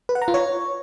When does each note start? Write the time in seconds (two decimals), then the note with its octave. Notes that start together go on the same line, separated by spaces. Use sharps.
0.09 B4
0.15 F#5
0.22 A#5
0.28 F4
0.34 C#5